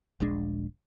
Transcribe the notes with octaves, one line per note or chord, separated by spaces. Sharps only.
D#1 A#1 G#3 D4